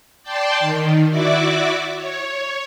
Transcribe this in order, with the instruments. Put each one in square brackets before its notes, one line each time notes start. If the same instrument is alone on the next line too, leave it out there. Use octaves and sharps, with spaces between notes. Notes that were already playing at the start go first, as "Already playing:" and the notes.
[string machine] D5 G5 A5 C6
D#3
E4 F#4 D5 E5 D6
C#5